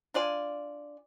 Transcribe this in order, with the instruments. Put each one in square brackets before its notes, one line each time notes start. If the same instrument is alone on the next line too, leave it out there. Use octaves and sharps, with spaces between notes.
[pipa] D4 F4 D5 G#5